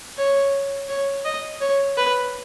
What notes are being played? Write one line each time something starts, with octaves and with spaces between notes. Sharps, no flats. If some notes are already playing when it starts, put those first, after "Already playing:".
C#5
C#5
D#5
C#5
B4